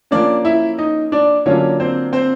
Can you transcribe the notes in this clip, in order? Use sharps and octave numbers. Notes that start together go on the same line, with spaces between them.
F3 A#3 C#4 D4 D5
E4 E5
D#4 D#5
D4 D5
D3 F#3 A#3 C#4 D4 F4 C#5
C4 C5
C4 C5